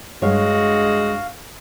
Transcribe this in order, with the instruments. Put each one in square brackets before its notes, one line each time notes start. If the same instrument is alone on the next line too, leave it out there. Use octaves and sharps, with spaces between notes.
[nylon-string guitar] G2 C#5 [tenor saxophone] G#3 [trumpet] F#4 [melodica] F5